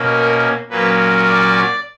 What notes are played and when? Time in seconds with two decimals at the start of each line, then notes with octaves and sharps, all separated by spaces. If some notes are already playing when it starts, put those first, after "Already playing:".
Already playing: B2 A#3 C#4
0.14 A#4
0.70 A#2 F#3 A#3 C#4 B4
1.25 D5